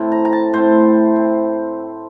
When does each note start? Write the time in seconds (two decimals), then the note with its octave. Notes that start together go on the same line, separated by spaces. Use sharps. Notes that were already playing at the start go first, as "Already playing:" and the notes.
Already playing: A2 A3 C4
0.12 A#5
0.25 A#5
0.33 A5
0.53 A2 A3 C4 C5
1.16 C4